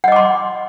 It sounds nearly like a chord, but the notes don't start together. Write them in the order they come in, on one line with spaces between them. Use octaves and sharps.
F#5 D#5 D6 C6